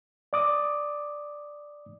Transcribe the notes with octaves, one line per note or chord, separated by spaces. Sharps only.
D5 D6 D#6